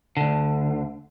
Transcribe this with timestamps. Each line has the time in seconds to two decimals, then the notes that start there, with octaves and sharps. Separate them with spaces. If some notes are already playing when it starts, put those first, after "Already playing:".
0.17 D2 D3